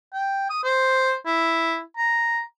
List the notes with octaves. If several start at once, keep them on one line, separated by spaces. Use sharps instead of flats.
G5
D#6
C5
E4
A#5